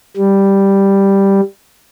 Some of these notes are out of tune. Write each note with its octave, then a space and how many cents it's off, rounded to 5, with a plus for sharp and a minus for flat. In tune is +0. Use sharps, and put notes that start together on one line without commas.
G3 +0